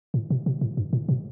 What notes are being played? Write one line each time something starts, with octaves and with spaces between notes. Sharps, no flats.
A2
B2
B2
A2
G2
A2
B2